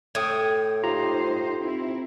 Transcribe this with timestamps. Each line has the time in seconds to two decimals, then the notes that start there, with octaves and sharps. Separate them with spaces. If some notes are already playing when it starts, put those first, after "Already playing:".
0.15 A2 G5 D#6 G#6
0.83 D#4 F4 G4 C5 A#5
1.60 C4 E4